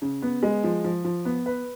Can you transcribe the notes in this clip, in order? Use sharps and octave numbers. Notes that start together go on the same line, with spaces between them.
C#3
B3
G#3
F3
F3
F3
B3
B4